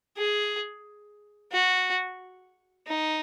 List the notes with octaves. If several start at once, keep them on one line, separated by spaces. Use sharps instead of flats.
G#4
F#4
D#4